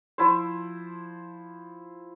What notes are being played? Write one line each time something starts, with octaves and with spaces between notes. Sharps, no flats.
F3 E4 C5